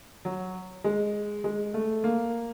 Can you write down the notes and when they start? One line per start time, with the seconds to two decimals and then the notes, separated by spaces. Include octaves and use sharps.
0.25 F#3
0.84 G#3
1.44 G#3
1.74 A3
2.04 A#3